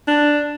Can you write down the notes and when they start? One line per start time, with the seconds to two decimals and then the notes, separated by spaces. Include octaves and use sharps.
0.08 D4